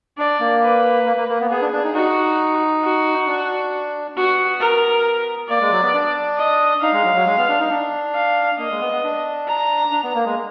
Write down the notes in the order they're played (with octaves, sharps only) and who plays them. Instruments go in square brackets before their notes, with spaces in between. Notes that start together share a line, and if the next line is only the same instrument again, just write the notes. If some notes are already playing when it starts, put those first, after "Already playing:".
[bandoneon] D4 [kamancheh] D5
[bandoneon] A#3
[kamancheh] B4
[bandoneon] A#3
A#3
A#3
B3
[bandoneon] B3 [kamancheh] G#4
[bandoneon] D4
D4
D#4
[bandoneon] D#4 [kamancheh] F#4
[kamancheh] F#4
[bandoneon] D4
[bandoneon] B3 [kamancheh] F#4
[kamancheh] A#4
[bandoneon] A#3 [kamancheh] D5
[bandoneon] G#3
F#3
B3
D4
[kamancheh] D#5
[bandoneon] D#4 [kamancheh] F5
[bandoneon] G#3
F#3
F#3
G#3
B3
D4
D#4
D4
[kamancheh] F5
[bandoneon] A#3 [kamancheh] D#5
[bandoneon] G#3
B3
B3
D4
[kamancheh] A#5
[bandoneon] D4
B3
A#3
G#3